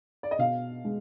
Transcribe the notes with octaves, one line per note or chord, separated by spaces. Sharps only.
D5
D#5
B2 F5
G#3